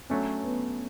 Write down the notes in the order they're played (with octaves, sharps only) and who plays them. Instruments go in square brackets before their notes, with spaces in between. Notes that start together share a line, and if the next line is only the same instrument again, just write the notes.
[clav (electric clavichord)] F#3 A3 D4 [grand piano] C#4
[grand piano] B3